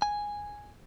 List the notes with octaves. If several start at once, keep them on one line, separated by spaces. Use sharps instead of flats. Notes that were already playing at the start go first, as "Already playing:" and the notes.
G#5